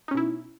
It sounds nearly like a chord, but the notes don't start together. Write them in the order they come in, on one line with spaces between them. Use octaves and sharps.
D#4 C#4 B2 E4